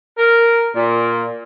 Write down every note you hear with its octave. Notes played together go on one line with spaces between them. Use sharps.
A#4
A#2